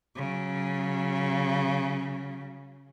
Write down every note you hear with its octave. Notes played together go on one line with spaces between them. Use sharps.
C#3 F#3